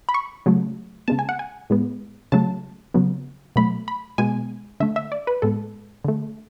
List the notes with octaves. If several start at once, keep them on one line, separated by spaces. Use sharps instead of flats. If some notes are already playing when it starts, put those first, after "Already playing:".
B5
C#6
C#3 F#3 A3
C#3 G#3 B3 A5
G#5
F#5
G#5
A2 G#3 B3
C#3 F#3 A3 A5
C#3 F#3 B3
B2 F#3 A3 B5
B5
B2 G#3 B3 G#5
D3 A3 E5
E5
D5
B4
A2 G#3 B3 A4
D3 A3